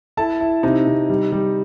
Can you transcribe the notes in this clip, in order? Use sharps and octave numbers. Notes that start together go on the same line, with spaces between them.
E4 A4 A5
E4
C3 D#4 D#5
C3
G3
G3